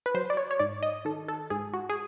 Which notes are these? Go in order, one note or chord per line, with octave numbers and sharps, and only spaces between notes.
B4
F#3 C5
D5
C#5
C#5
G#2 D5
D#5
D#3 A4
A4
G#2 G#4
F#4
G#4